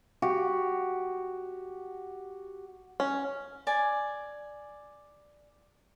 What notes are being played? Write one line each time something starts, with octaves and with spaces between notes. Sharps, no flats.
F#4 G4
C#4
D5 G#5